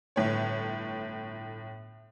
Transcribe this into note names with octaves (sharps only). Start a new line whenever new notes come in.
G1 A2 C#5